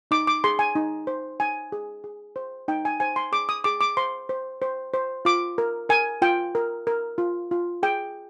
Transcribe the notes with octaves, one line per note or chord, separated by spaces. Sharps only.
D#4 D6
D6
G#4 C6
G#5
D#4
C5
D#4 G#5
G#4
G#4
C5
D#4 G5
G#5
C5 G#5
C6
G#4 D6
D#6
G#4 D6
D6
C5 C6
C5
C5
C5
F4 D6
A#4
A#4 G#5
F4 G5
A#4
A#4
F4
F4
G#4 G5